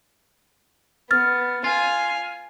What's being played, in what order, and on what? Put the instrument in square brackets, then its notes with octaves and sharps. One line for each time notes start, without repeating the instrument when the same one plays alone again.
[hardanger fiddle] B3 [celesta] F6 A6
[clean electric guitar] F4 [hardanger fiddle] F5 G#5